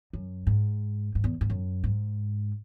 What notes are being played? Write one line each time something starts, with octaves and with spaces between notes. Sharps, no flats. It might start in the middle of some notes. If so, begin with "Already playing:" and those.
F#2
G#2
G#2
E2
G#2
F#2
G#2